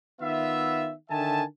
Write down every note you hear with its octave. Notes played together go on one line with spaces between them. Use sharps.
D#3 B3 F4 E5
D3 D#3 E5 G#5 A5